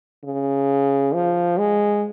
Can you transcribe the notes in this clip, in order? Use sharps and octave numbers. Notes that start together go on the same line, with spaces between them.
C#3
F3
G#3